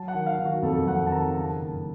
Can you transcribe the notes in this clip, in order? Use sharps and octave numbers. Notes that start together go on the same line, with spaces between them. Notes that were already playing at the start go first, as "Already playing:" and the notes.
Already playing: F#3 A5
F#5
D#3
F5
D#3
F#4
F2 A4
F2 F#5
A5
D#3 A#5
C#3 A5
F#1